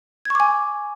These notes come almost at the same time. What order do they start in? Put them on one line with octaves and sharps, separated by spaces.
G#6 C#6 D6 G#5